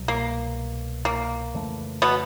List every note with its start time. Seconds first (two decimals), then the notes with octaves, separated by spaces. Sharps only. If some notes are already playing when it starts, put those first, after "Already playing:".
Already playing: C2 B2 F#3
0.08 A#3
1.05 A#3
1.54 F2 C#3 E3 A3
2.02 B2 B3